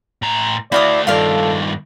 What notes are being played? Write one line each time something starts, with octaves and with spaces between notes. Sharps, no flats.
A2 A#5
A3 E4 F#4 D5 F5 D#6
G2 D#3 F4 A4 D5 F5